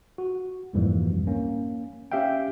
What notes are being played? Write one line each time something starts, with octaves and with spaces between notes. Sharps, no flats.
F#4
C2 F2 G#2 E3 G3 A#3
A#3 C#4
C#4 G4 E5 F5 G5